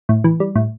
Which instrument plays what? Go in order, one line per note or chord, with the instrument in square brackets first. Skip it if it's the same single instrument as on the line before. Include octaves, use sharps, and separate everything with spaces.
[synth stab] A2
E3
G3
A2